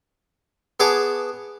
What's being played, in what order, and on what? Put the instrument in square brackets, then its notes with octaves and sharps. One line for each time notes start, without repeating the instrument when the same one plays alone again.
[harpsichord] B3 G#4 C#5 A5 D6